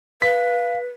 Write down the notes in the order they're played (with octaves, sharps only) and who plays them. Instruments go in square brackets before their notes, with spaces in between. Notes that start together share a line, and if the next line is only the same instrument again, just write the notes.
[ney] B4 [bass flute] F5 [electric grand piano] B6